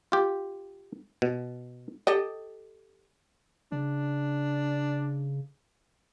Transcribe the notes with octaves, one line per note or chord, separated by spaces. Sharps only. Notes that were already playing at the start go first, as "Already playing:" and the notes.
F4 G4
B2
G4 A4 D#5
C#3 D4